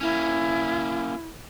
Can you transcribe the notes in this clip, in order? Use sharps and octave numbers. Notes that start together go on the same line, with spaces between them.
A#3 C#4 E4